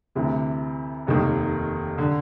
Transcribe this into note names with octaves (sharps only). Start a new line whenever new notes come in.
D2 C3 E3
F1 D#2 D#3
D3